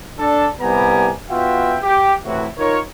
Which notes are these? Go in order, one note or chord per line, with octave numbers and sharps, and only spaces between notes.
D4 A4
C2 G3 B3 G4 G#5 A#5
B3 F4 F#4 E5 G5
G4
A2 C3 E3 E4 F#4
D#4 F4 A#4 C#5